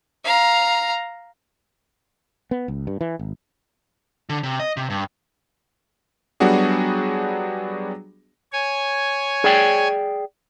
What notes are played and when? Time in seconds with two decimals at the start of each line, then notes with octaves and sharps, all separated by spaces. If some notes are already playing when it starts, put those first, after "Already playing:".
0.24 F5 A#5
2.51 B3
2.68 C#2
2.87 G2
3.01 E3
3.19 G#1
4.29 D3
4.43 C3
4.60 D#5
4.77 C3
4.90 G2
6.40 F#3 G3 B3 D4 F#4 G#4
8.53 C#5 G#5
9.44 G#4 D5 G5